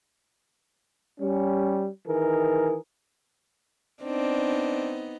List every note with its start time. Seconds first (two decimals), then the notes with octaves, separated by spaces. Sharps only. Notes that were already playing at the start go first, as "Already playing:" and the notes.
1.19 G3 C#4
2.07 D#3 E3 G#4 A#4
4.04 B3 C4 D4 D#4